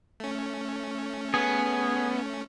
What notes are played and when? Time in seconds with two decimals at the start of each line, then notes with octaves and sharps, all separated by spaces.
0.20 A3 C#4
1.34 B3 G#4